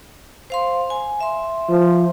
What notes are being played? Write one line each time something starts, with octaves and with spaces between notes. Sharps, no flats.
C5 F5 C6
G#5
E5 C6
F3